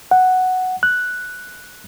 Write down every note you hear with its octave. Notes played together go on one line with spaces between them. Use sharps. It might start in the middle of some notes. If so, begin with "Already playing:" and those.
F#5
F#6